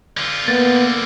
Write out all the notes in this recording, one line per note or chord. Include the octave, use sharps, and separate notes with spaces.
D3 F4
A#3 B3 A6